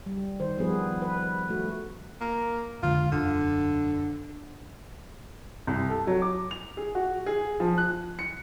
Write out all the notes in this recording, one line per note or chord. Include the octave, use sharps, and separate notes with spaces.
G3
D#3 C5
F3 G3 B3 G#4 B4
B4
A3 F#4
A#3
F2 D3 G#3 F4
E1 F#2 D3
C2
A4
F#3
D6
F7
G#4
F#4
G#4
F3
F#6
C#7